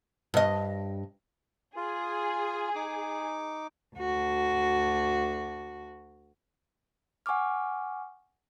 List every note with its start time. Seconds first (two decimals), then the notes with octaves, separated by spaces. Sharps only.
0.34 G2 D#5
1.76 F4 G#4
2.75 D#4 D6
3.95 D2 F#4
7.26 F#5 G#5 C#6 D6 F6